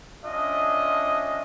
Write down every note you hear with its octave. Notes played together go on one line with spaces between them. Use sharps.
C#4 D4 F4 D#5 E5